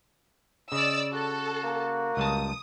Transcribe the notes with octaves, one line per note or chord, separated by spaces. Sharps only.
C#3 D5 D#5 E6
F#4 A4
A#3
C#2 G3 A5 D#6